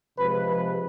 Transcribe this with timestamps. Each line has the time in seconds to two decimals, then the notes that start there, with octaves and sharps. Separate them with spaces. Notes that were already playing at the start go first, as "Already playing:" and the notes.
0.19 C3 F3 G#3 B4
0.48 B4